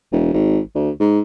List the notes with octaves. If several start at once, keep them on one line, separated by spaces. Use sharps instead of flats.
E1
G#1
D2
G#2